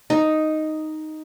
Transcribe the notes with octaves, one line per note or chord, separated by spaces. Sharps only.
D#4